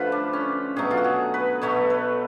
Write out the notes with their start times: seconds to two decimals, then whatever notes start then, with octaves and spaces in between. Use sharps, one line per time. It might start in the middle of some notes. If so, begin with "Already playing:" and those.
Already playing: D3 F3 A3 F4 B4
0.12 D4
0.33 C#4
0.76 B2 F#3 A3 G#4
0.91 F4
0.97 F#4
1.04 G#4
1.34 B4
1.62 B2 F#3 A3 C#5
1.90 B4